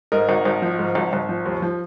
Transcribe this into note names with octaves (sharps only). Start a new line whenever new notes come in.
G#2 A#4 D#5
G#1
G#1
F3
G#2
G#1
G#1
F3
D#2
F3